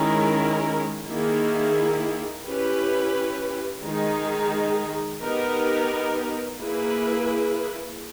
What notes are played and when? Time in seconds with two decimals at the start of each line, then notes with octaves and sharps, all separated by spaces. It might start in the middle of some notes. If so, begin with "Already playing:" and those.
Already playing: D#3 G#3 C#4 E4 A#4
1.08 D#3 A#3 E4 G#4
2.46 C#4 E4 G4 B4
3.84 D#3 G#3 D#4 G#4
5.21 B3 D#4 G4 A#4
6.60 A#3 E4 G#4 B4